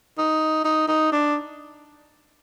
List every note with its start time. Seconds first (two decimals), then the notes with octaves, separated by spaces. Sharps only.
0.18 D#4
0.65 D#4
0.88 D#4
1.12 D4